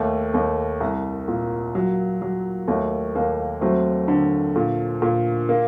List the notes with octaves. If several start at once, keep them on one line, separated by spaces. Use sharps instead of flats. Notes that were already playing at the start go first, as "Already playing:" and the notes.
Already playing: D#2 A3
D#2
C2
A#2
F#3
F#3
D#2 A3
D#2 A#3
F#3 A3 C4
D3
A#2
A#2
A#3